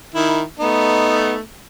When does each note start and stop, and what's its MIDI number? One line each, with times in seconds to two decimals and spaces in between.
0.15 0.42 51
0.15 0.42 64
0.60 1.38 57
0.60 1.38 59
0.60 1.38 63